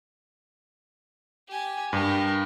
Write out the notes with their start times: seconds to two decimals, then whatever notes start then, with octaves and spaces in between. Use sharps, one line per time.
1.48 G4 G#5
1.93 G2 G4 A#4